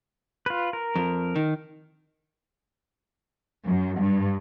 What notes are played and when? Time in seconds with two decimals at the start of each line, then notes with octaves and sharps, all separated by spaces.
0.46 F4 B4
0.73 A#4
0.96 F2
1.36 D#3
3.65 F#2
3.99 G2